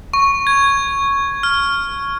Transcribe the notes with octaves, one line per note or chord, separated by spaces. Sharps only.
C#6
G#6
F6